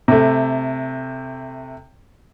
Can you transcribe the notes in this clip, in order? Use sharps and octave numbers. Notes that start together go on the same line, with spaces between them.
C3 A3